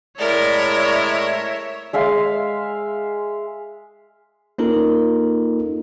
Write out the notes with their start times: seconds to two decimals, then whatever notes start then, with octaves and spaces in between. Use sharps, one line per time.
0.19 A2 G#3 A#4 C#5 D5 E5
1.93 G#3 E5 F5 C6
4.58 A#3 C#4 D#4 F4 A4 A#4